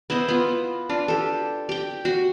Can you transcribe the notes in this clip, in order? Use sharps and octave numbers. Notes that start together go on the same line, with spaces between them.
B3 E4 C5 D#5
B3 F4
D4 F4
G4 A4
G4 G5
F#4